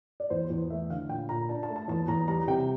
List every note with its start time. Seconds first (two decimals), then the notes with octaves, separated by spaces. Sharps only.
0.20 D5
0.30 E2 C5
0.50 E2
0.70 A3 E5
0.90 D3 F5
1.09 A#2 G5
1.29 A#2 A#5
1.49 D4 A5
1.63 A5
1.68 A3
1.76 A5
1.88 E2 A5
2.08 E2 A#5
2.28 G3 A#5
2.47 C3 G5